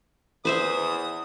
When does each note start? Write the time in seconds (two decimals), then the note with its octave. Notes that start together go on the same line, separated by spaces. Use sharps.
0.45 E2 B4 C5 E5 D#6